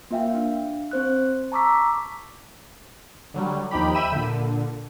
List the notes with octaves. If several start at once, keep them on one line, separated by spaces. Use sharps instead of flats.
A#3 F4 E5 F5 G5
D4 F5
C4 C5 F#6
A5 A#5 C#6 D6 E6 B6
D3 F#3 G3
D#2 F3 D#4 G4 B5
E5 G5 B5 E6 D#7 E7
A#2 D3